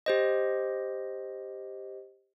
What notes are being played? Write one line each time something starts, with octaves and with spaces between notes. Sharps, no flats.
G4 C5 D#5